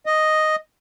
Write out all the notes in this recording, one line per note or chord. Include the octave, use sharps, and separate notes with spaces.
D#5